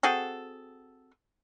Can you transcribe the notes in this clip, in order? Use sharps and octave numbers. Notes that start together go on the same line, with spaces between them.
C4 F#4 G#4 A4